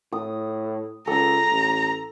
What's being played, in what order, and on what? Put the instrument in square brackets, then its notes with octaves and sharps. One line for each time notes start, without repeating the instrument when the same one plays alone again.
[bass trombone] A2 [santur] D#6
[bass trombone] C#2 [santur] A4 [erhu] A#5
[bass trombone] A1